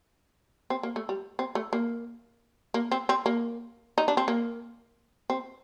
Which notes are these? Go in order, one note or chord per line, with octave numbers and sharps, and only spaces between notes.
C4
A#3
A3
G3
C4
A3
A#3
A#3
C4
C4
A#3
D#4
D4
C4
A#3
C4